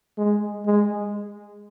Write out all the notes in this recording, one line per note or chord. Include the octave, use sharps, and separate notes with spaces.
G#3
G#3